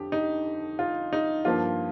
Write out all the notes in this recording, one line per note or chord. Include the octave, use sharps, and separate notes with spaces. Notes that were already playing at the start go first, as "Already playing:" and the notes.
Already playing: F2 D3 G4
D#4
F4
D#4
G2 F3 A#3 F4